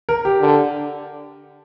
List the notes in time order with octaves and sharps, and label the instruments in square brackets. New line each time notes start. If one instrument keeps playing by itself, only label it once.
[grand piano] A#4
G4
[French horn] D3